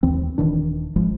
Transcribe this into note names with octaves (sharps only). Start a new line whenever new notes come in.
D#2 E3 C4
D#1 D#3 E3 D4
G#1 F3 G#3